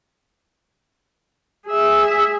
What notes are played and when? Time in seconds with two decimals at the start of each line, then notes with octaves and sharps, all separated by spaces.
1.66 G#4 E5